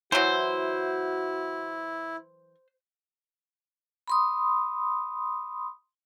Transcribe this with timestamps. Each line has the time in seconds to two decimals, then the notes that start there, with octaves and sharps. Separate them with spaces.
0.12 E3 F#3 E4 F#4 C5
4.08 B5 C6 D#6